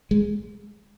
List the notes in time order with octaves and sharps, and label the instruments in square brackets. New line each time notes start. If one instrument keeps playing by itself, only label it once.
[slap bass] G#3